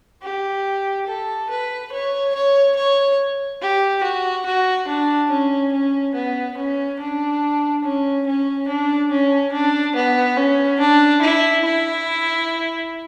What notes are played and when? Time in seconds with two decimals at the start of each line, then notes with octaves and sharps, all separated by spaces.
0.22 G4
1.07 A4
1.49 B4
1.92 C#5
2.35 C#5
2.76 C#5
3.61 G4
4.03 F#4
4.46 F#4
4.88 D4
5.30 C#4
5.72 C#4
6.14 B3
6.57 C#4
6.99 D4
7.84 C#4
8.26 C#4
8.68 D4
9.11 C#4
9.52 D4
9.95 B3
10.37 C#4
10.79 D4
11.22 E4
11.64 E4